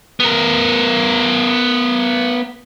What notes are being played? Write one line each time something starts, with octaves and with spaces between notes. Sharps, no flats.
B3 A#4